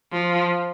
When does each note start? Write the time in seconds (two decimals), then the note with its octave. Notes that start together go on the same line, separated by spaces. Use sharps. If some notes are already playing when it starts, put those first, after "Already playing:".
0.12 F3